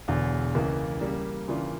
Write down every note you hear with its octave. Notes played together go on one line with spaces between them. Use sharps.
E1 E2 D3
C#2 C#3 E3 A#3
C#3 G3 A#3
C#3 E3 A#3 D4 F4